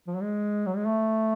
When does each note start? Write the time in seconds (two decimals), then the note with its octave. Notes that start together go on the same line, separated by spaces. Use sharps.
0.07 F3
0.15 F#3
0.22 G#3
0.66 F#3
0.76 G#3
0.87 A3